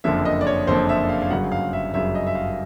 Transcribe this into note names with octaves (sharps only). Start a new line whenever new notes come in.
F#1 F2 D3 F3 A#3 E5
D#5
D5
C#5
F#1 F2 D3 F3 A#3 C5
E5
F5
F5
G1 F#2 C#3 F#3 F#5
F5
E5
G1 F#2 C#3 F#3 E5
D#5
E5
F5